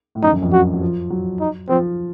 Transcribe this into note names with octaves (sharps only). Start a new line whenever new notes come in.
A2
F#2 D#4
F#2
F2
F#2 F#4
F#3
F3
F#3
D#4
F3 C4